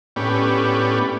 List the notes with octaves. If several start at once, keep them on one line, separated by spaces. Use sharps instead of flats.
A2 B3 C#4 D4 G4